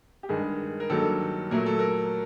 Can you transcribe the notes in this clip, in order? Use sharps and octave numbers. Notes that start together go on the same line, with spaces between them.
G4
G2 D#3 G#3 G#4
A#4
G2 D#3 F#3 A#3 A4
A#2 F#3 A3 A#4
A4
A#4